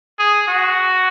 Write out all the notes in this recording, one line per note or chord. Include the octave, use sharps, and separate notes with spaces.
G#4
F#4